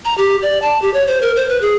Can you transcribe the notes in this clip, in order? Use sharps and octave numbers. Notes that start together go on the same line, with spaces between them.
A#5
G4
D5
A5
G4
C#5
C5
A#4
C5
B4
G#4